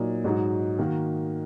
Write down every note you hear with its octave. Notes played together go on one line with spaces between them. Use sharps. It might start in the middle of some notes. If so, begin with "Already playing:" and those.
Already playing: A#2 F#3 D#4
G#2 F#3 D#4 F#4
D#3 A#3 F#4